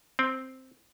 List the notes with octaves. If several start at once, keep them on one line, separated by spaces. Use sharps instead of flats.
C4